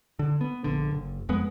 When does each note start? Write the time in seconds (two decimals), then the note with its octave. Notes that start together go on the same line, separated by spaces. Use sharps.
0.19 D3
0.41 B3
0.64 A#1 D3
0.91 F#1
1.29 F2 G#3 B3